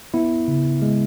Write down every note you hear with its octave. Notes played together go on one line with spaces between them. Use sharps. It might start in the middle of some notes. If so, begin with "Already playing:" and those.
B3 E4
C#3
G#3